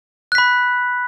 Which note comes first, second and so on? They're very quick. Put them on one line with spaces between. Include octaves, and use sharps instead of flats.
F#6 B6 B5